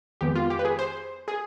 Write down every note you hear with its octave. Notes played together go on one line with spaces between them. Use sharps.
F2 D#3 G#3 B3 G4
F4
G4
B4
G#4
C5
G#4